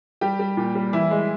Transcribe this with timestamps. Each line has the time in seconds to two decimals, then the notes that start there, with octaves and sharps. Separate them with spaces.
0.21 G3 G4
0.39 G3
0.57 A#2
0.75 G3
0.93 E3 E4
1.11 G#3